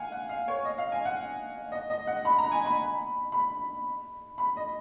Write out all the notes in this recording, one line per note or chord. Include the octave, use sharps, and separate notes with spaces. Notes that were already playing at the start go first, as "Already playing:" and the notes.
Already playing: F5 F#5 G#5
F#5
F5
C#5
D#5
F5
G#5
F#5
D#5
D#5
F#5
B5
A#5
G#5
B5
B5
B5
D#5